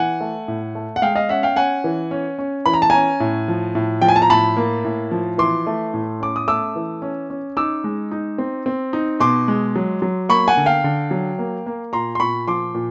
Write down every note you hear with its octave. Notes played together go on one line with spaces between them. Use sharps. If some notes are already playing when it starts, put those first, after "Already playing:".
Already playing: E3 F#5 G#5
A3
A2
A3
F#5
G#3 F5 G5
D#5 F5
C#4 E5 F#5
F5 G5
C#4 F#5 G#5
E3
C#4
C#4
E3 B5
A#5
A5
C#4 G#5 A#5
A2
F3
A2
F3 G5
G#5
A5
A#5
A2 A5 B5
A#3
A2
F3
E3 C6 D6
A3
A2
C#4 D6
D#6
A3 D6 E6
E3
C#4
C#4
D#4 D6 E6
G#3
D#4
C4
C4
D#4
B2 C6 D6
G#3
F#3
F#3
A#3 B5 C#6
F#5 G#5
D3
F5 G5
D3
F#3
A#3
A#3
A#2 A#5 C6
C6
A#2 B5 C#6
F3 C6 D6
A#2